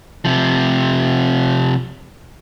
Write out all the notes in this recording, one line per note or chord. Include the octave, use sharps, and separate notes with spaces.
C3 F3